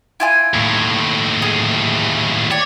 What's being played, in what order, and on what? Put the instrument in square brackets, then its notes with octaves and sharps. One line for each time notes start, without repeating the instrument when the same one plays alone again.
[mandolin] E4 F4 G#5
[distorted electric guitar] D#2 A2
[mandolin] G#4
[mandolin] G4 D5 [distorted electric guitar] C#5